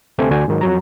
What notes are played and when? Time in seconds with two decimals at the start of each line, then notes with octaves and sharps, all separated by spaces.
0.18 D2 C3 A3 C4 G#5
0.30 D2 D3 F#4 D5 G#5
0.48 G#2 D#3 F#3
0.61 F2 F#3 A#5